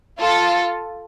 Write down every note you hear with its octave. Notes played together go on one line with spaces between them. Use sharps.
F4 A4